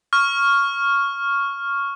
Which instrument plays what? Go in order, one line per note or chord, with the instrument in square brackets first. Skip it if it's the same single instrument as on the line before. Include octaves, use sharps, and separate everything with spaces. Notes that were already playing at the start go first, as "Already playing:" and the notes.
[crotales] C#6 F6